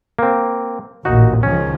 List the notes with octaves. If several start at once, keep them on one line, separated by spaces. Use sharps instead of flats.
A#3 C4
A1 D#2 A#2 D#4 F#4
C#2 D#3 F3 C#4